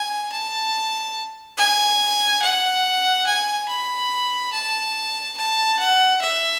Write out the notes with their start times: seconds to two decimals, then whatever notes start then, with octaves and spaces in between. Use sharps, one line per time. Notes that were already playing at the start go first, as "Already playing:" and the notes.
Already playing: G#5
0.32 A5
1.57 G#5
2.42 F#5
3.26 G#5
3.68 B5
4.53 A5
5.37 A5
5.79 F#5
6.21 E5